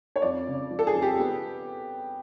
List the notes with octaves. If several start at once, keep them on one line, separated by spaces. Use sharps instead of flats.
C#5
F2 D5
C#3
F3
A4
G#4
F2
G4
B3